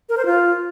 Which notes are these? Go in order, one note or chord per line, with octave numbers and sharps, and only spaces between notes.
A#4
C5
F4